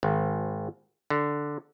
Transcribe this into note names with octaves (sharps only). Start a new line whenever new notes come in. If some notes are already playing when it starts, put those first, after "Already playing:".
G#1
D3